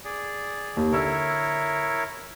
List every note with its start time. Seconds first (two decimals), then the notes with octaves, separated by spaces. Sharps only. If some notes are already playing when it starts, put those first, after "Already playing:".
0.05 G#4 D5
0.77 D#2
0.92 D3 E4 A#4 C#5 E6